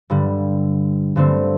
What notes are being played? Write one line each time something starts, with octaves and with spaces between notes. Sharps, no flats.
G2 D3 G3
G2 D3 A3 C4